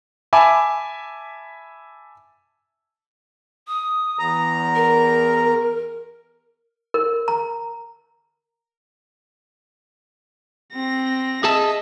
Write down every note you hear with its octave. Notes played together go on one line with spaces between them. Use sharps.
E5 G#5 A5 B5 D6
D#6
E2 A#5
A#4
A#4
A#5
C4 A#6
G#4 D#5 E5 A5